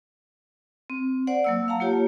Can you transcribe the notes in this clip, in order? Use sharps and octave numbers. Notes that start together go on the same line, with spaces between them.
C4
C5 D5 F#5
F#3 A#3 E6
F5 F#5 A5 A#5
A#3 F4 G4 C#5